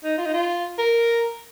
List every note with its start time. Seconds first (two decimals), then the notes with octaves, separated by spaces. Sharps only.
0.04 D#4
0.18 F4
0.26 D#4
0.34 F4
0.78 A#4